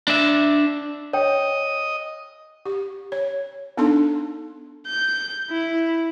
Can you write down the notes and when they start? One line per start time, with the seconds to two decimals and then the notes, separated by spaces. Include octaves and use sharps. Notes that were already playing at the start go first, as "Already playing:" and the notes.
0.08 D4 E5
1.13 C#5 D#5 G5
2.65 G4
3.12 C#5
3.77 B3 D4 D#4 A4 A5 C6
4.87 G6
5.50 E4